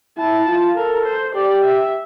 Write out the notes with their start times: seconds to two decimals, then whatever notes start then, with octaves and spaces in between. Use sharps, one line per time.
0.18 E4 A5
0.48 F4
0.76 A4 A#4
1.06 C5
1.35 G4 D5
1.65 E5